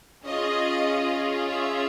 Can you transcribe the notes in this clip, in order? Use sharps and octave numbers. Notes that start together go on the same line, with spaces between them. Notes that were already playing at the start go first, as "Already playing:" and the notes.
C#4 F4 G#4 D#5
E5